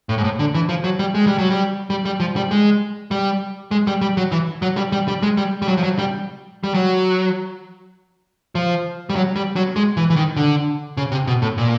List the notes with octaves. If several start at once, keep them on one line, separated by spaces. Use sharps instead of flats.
A2
G#2
A2
D3
E3
F3
F#3
G3
G#3
G3
F#3
G3
G3
G3
F3
G3
G#3
G3
G#3
G3
G3
F#3
E3
F#3
G3
G3
G3
G#3
G3
G3
F#3
F3
F#3
G3
G3
F#3
F3
G3
F#3
G3
F#3
G#3
E3
E3
D#3
D3
C#3
C3
B2
A2
A#2